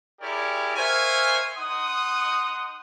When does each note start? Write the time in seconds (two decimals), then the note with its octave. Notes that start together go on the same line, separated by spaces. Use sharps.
0.20 E4 G4 G#4 A#4 C#5 D5
0.76 A#4 C5 C#5 E5 F5 G#5
1.57 D#4 F#5 C6 D#6